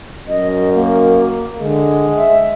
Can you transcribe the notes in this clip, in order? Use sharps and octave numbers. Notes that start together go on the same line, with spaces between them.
F#2 D#5
A#3
D3 G#3
E5